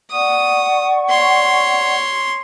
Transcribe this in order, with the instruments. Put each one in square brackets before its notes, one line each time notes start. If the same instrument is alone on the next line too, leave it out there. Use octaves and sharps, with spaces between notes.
[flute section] D5 F#5 C#6 [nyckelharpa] D#6
[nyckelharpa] C#5 C6